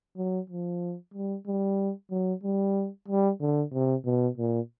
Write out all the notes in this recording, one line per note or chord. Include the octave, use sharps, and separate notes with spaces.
F#3
F3
G3
G3
F#3
G3
G3
D3
C3
B2
A#2